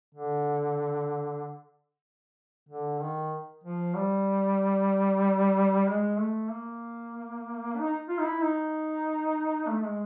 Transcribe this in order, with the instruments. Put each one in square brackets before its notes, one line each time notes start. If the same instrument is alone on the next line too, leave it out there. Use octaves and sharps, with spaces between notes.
[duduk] D3
D3
D#3
F3
G3
G#3
A3
A#3
D#4
F4
D#4
E4
D#4
A3
G#3